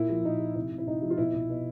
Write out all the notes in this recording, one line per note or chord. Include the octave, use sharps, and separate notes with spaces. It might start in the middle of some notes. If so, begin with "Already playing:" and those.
Already playing: A#2 E4
F3
A#2 D#4
F3
C3 E4
C3
E4
C3 D#4
F3
F4
B2 E4
B2
B2